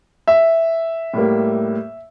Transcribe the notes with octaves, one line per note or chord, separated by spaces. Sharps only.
E5
A2 G3 A#3